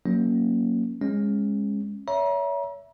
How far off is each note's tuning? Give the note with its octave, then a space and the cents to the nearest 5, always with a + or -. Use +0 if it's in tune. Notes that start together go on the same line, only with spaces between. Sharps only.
F#3 +0 A#3 +5 C#4 +0
G#3 -15 C#4 -20
C#5 +30 E5 +0 A#5 +40